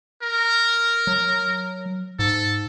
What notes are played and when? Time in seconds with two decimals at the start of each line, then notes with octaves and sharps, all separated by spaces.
0.22 A#4
1.07 F#3
2.19 G#2 A4